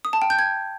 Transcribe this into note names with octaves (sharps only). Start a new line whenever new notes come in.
D#6
A5
G5
G6
G#6